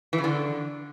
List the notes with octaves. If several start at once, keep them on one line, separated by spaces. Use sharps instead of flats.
E3
C#3
D3